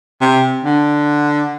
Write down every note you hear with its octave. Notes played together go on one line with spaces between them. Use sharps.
C3
D3